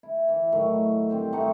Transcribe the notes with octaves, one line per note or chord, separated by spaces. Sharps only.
E4
E3
A2 D#3 F#3
G2 C4 C5
A3 D#4 F#4 F#5